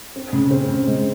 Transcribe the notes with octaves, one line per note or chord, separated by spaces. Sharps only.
C4
C#3
C4
C#3
G#3